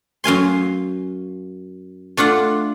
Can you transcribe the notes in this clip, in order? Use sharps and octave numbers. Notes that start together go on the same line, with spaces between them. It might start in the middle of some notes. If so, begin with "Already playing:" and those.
F#2 F5 G#5 C6
A3 D4 F4 F#5